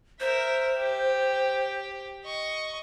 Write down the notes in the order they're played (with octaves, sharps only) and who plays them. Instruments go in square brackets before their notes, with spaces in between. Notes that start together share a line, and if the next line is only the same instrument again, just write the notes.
[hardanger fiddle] A#4 E5 [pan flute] C5
[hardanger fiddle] G4
D#5 C#6